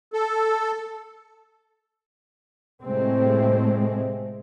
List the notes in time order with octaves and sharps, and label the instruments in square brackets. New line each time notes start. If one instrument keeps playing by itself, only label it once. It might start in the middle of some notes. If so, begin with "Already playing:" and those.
[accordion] A4
[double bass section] A2 C3 G#3 A3 C4